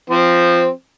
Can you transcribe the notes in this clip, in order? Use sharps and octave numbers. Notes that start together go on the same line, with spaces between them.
F3 C4 C5